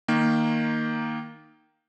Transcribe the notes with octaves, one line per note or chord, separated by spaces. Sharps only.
D#3 A#3